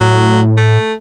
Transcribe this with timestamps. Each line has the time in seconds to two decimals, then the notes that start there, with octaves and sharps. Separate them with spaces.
0.01 A2 F#3
0.57 A3